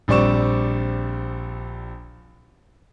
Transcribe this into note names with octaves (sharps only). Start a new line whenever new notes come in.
A#1 G3 C4 D5 C#6 E7